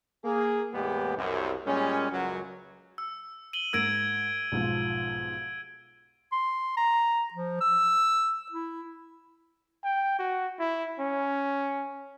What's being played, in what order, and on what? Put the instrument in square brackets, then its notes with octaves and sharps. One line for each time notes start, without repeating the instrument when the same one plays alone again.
[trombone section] A#3 G#4
E2 A2 G#3 A#3 B3 G4
C2 F#2
A#2 G3 G#3 C#4
C#2 F#2 F#3
[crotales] E6
D#7 F#7 G7
[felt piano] G#2 A#4 A#6 [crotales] E6 G#6 D7
[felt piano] B1 G#2 F3
[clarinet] C6
A#5
F3
E6
E4
[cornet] G5
F#4
E4
C#4